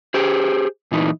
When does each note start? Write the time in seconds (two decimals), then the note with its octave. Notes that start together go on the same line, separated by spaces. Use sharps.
0.14 G4 G#4 C5
0.92 A#2 E3 D#4